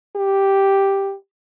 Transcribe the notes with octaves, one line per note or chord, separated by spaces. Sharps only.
G4